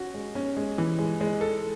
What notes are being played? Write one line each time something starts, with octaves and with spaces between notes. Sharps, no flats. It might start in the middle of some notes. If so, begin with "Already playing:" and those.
Already playing: C#4 F#4
G#3
C#4
G#3
E3
G#3
G#3
A4